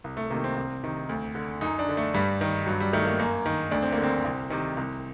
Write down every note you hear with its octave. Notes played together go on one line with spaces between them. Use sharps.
C2
A3
C3 D#3 A#3
C4
C2
C3 D#3
D2
D3
F#2 D#4
D4
D3
A3
G2 G3
D#3
G2 F#3
G3
D#3 A3
A#3
F#2 A#3
D#3
D2 D4
C4
A#3
D3
C4
C2
C3 D#3
C2